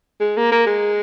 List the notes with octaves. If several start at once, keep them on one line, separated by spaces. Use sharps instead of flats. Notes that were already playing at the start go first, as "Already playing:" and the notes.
G#3
A#3
A#3
G#3